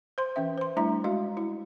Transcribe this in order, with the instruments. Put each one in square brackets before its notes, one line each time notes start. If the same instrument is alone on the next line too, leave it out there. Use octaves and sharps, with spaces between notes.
[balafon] C5 C6
E3 C#4 E5
C5 C6
G3 A3 D4 E4 E5 A#5
G#3 F#4 F5
E4